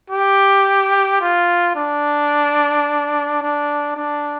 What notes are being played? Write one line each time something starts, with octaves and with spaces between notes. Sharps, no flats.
G4
F4
D4
D4
D4